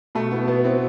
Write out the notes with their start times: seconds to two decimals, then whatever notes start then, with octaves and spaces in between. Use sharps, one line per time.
0.15 B2 A3
0.31 B3 E4
0.47 B2 B3
0.64 B3 C4 E4